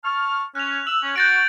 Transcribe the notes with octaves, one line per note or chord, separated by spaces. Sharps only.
A5 C#6 F6
C#4 F#6 F7
E6 F#7
C#4
F#4 G6 A6 D7